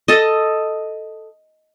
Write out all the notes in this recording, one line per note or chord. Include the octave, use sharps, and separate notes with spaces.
A4 D#5